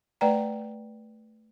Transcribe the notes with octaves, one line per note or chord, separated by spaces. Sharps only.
A3 B4 D5 G5 A#5